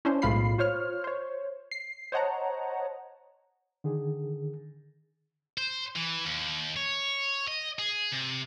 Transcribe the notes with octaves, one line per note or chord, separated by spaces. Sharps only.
C#4 D4 E4 C5
B1 A2 G#3 F4 B5 C7
F4 C5 C#5 F6
C5 C#5
C7
C5 C#5 D#5 F#5 A5 A#5
D3 D#3 G#4
C5
E3
D#2
C#5
D#5
G#4
C3